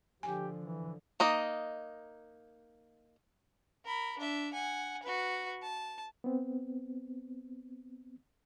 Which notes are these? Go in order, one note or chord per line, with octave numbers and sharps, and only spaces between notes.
D3 F3 G4 G#5
E3
A#3 D#4 D#5
A#4 B5
D4 E5
F#5 G#5
F#4 B4
A5
B3 C4